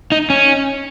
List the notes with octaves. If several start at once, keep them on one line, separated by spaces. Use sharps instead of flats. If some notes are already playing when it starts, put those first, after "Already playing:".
D#4
C#4